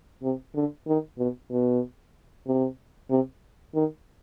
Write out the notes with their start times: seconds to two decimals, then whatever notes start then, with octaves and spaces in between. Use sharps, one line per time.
0.23 C3
0.55 D3
0.87 D#3
1.18 B2
1.51 B2
2.47 C3
3.10 C3
3.75 D#3